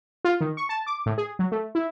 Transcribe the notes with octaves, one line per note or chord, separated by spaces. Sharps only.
F4
D#3
C#6
A5
D6
A2
G#4
F#3
A3
E4